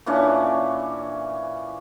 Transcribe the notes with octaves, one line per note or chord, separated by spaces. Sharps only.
A#2 E3 C#4 D4